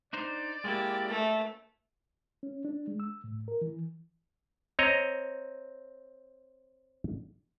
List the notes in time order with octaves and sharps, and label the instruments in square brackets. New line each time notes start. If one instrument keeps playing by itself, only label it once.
[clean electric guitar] D4 D#4 C5 [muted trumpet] D5
[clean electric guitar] G#3 A#3 E4 [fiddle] G4
[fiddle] A3
[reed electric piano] C#4
D4
G#3
E6
A2
A#4
E3
[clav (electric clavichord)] C4 C#5 D#5 A#5